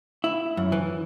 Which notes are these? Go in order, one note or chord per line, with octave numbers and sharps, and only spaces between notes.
E4
F#2
E3